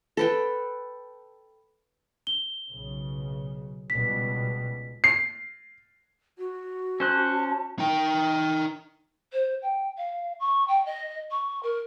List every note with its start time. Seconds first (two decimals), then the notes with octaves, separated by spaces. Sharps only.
0.17 A4 B4 G5
2.27 G7
2.71 B1 C#3
3.90 C#2 B2 G3 B6
5.04 C7
6.38 F#4
7.00 C#4 C5 A5 F#6
7.79 D#4 G5
9.33 C5
9.62 G5
9.98 F5
10.40 C#6
10.68 G5
10.85 D#5
11.31 C#6
11.63 A#4